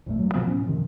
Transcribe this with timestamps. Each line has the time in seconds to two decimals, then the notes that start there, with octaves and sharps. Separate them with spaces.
0.06 A#1 F2 A#2 A3
0.19 G2 F#3
0.34 C#2 B2 F3 B3
0.45 A2 C#4
0.66 F#2 C3 D#3 F3